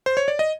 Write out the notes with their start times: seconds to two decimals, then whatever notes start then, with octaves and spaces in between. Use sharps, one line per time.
0.06 C5
0.17 C#5
0.28 D5
0.39 D#5